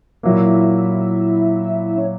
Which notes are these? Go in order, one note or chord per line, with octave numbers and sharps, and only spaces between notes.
A#2 F#3 A#3 E4 E5
C#4 C#5